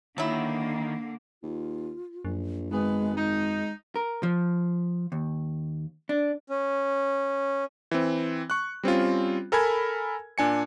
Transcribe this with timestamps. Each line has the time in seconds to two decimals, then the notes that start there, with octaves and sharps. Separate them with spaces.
0.18 D3 D#3 F#3 A#3 E4
1.43 D#2 F4
2.25 A#1 F#2
2.71 G#1 G#3 B3 G#4 B4
3.16 G#3 D#4
3.96 A#4
4.23 F3
5.12 D#2
6.09 D4
6.48 C#4
7.91 E3 C4
8.50 C#6 F#6
8.83 G3 C4 C#4 F4
9.52 A4 A#4 G#5 B5 G#6
10.38 A#2 D4 G#5 C#7